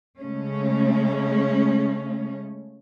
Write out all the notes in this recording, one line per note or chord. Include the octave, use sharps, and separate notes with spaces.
C#3 G#3 A3 C#4